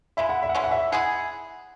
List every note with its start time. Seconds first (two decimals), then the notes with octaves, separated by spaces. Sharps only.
0.17 C#3 G#3 E4 E5
0.29 F#5
0.43 E5
0.49 F#5
0.55 E3 G#3 C#4 E5
0.64 F#5
0.71 E5
0.92 G#3 E4 G#4 F#5